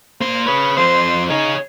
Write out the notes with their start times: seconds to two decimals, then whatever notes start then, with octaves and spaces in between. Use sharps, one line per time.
0.21 A#3 C5 C6
0.47 G#4 B4 C#5
0.77 F3 C4 C5
1.30 D#4 G#4 C#5